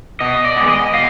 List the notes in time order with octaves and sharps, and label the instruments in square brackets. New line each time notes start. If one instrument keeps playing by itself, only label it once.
[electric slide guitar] B2 D#5
D5
G#3 B3
D#5
B2 F5